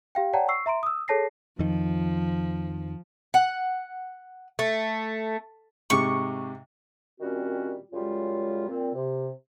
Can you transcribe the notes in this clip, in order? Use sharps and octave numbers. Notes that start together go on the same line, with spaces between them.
G4 F5 G5
C#5 D5 F#5 G5 A5 A#5
C#6 E6 C7
E5 A#5 C6 D7
D#6 E6
G#4 A4 C#5 A5 A#6 C7
F2 D#3 F3
F#5
A3
G#2 C3 C#6 D6
A#2 D#3 G3 C4 C#4 F#4
F#2 C#3 G3 G#3 F4
A#2 C4
C3